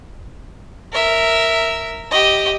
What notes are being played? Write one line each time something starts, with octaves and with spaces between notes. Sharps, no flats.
A#4 E5
G4 D#5